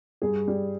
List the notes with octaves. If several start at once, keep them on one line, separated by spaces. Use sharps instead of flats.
G2 G#4
G3